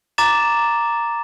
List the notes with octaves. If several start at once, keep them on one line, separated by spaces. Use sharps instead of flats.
A#5 D6 A6 E7